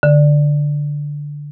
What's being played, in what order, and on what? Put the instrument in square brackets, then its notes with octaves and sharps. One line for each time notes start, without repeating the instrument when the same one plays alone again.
[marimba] D3